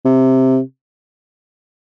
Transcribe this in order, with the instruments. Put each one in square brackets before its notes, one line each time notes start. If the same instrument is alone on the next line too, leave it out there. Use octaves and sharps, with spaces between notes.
[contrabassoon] C3